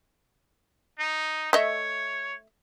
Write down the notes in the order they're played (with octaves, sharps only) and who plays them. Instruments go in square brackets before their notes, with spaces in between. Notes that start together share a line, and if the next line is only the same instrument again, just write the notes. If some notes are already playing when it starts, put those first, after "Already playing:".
[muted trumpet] D#4
[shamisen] A3 D#5 E5 [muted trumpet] C#5